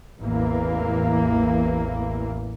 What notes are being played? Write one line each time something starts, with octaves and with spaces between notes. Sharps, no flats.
A1 E2 E3 A#3